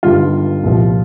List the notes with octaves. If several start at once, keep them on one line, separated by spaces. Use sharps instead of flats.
G1 G2 D#3 G3 F4
C2 A#2 F3